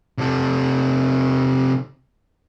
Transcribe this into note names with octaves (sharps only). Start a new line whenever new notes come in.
C3 A4